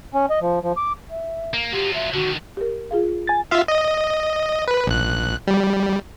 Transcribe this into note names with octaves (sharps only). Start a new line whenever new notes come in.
C#4
D#5
F3
F3
D6
E5
A#3
F#3 F4 G4
E5
D3 D#3 F#4
G4 A#4
F4 G#4 F5
G#5 A6
F4 E5 F5
D#5
B4
A#1 F#6
G3